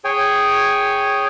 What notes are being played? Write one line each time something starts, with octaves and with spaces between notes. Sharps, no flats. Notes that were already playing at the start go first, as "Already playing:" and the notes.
G#4 C#5 G5 G#5